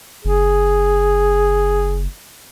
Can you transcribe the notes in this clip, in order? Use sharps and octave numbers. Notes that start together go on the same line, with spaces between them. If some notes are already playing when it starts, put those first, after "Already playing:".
F#1 G#4